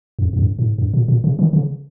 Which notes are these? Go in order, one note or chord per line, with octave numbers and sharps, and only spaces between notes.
F2
F2
F#2
G#2
F#2
A#2
A#2
C3
D#3
C#3